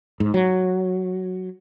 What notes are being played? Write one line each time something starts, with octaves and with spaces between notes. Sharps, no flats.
G#2
F#3